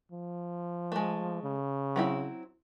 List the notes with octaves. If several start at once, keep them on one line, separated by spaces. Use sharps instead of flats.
F3
G#3 A3
C#3
F#3 C4 E4